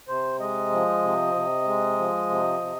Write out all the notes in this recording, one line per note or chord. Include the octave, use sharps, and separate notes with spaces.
C3 C5
G#3 D#5
F3
C3
C3
G#3
F3
C3
C3